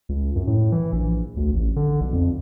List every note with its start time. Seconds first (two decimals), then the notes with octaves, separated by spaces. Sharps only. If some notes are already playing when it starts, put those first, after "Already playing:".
0.09 C#2
0.36 F#2
0.47 A2
0.72 E3
0.93 A#1
1.37 D2
1.53 A1
1.76 D3
2.01 B1
2.13 F2